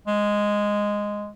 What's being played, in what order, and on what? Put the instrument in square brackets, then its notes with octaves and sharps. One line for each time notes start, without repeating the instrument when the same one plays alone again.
[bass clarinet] G#3